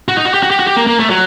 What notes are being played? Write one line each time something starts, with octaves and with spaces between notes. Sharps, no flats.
F#4
D#4
F#4
G4
F#4
G4
F#4
G4
A#3
A#3
A3
F#3